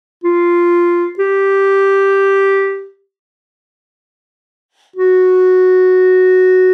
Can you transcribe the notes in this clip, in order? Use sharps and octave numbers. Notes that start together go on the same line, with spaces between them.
F4
G4
F#4